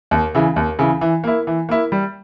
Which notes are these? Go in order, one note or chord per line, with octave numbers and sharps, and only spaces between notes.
D#2
C#3 E3
D#2
C#3 E3
E3
A#3 E4
E3
A#3 E4
G3